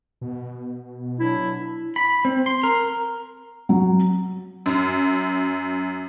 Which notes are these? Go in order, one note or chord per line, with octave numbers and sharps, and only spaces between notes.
B2
F#3 D4 E4
B5
C4
C6
A#4
F#3
F#2